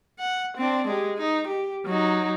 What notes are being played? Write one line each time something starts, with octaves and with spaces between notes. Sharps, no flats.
F#5
C4 D4
G#3 G4
D#4
G4
F#3 D#4